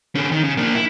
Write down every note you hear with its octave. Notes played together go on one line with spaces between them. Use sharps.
D3 C#4
D#3
C#3
A#3 D4
E4